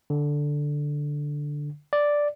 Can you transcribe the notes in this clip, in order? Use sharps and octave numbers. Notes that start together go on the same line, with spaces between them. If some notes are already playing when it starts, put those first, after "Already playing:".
D3
D5